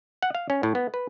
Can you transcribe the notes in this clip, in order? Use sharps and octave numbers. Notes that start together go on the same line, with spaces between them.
F#5
F5
C#4
A2
B3
B4